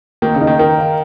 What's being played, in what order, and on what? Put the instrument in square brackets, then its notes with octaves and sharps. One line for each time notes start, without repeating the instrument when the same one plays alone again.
[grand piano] D#3 [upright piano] A#3
[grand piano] C#3
[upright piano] D#4
[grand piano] D#3
[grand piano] D#3 [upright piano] A#4
[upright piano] F5